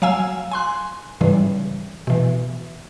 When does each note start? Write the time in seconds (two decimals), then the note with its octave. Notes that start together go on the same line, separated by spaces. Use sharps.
0.02 F#3 F5 G#5 E6
0.52 G#5 C6 F#6
1.21 G#2 C#3 E3 G3
2.07 B2 E3